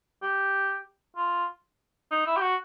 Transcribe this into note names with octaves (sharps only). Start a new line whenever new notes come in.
G4
F4
D#4
E4
G4
F#4